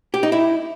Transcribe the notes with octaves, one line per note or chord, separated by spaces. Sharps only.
G4
D#4
E4